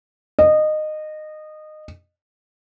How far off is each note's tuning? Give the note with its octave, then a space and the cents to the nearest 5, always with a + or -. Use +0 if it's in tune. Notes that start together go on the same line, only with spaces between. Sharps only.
D#5 -20